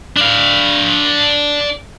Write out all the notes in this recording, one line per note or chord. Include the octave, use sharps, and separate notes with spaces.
D4 F5